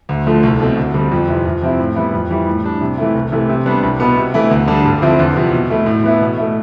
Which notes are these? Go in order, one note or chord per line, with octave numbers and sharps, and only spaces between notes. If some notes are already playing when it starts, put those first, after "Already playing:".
D2
D3 F3 A3
C2
B2 A3 C4
D2
D3 G3 C4
F2
C3 E3
F2
C3 F3 C4 E4
A2
E3 G3 B3 E4
F2
E3 G3
A2
G3 D4
C3
E3 A3 E4
C2
C3 E3 A3
C3
G3 B3 D4
C2
B2 B3
C3
E3 A3 E4
D2
D3 G3 D4
G2
D3 F3 C4 E4
E2
C3 F3
B2
A3 E4
A2
E3 B3 E4
B2
A3 E4